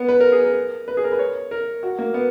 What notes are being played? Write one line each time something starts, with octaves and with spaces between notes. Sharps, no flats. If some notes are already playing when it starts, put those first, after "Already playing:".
Already playing: B3
B4
A#4
G#4
A#4
B4
G#4
A#4
B4
C#5
A#4
F#4
A#3
B3